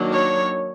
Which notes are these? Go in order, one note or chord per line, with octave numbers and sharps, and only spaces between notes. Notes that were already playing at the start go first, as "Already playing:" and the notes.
Already playing: D#3 F#3 A#3 D4
C#5